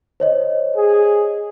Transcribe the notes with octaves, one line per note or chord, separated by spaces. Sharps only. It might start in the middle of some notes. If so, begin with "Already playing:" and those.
C5 C#5 D#5
G#4